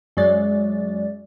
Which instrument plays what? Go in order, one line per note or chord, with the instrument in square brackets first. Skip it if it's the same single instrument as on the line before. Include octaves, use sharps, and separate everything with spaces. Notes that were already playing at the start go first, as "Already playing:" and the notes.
[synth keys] F#2 F#3 G#3 D5 A6